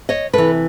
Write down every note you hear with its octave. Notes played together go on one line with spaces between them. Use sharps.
C#5 D#5
C3 E3 A4 B4